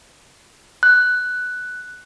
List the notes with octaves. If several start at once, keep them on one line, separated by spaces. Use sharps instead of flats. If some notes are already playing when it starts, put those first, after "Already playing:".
F#6